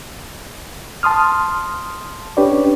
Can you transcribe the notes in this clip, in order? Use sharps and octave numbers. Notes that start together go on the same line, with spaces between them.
A5 C6 D#6 F6
C#4 D4 G4 B4 C#5 D5